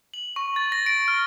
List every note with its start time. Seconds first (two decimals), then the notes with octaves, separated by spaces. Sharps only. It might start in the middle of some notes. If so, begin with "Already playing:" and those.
0.14 F#7
0.36 C#6
0.56 A6
0.72 A#6
0.86 D7
1.08 F6